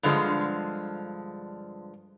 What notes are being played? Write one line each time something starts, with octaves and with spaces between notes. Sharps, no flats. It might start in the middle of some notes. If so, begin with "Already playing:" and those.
G2 D3 F3 G#3